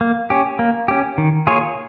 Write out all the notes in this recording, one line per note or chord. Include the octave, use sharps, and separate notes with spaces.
A#3
C#4 G4
A#3
C#4 G4
D#3
A#3 F4 G#4 C#5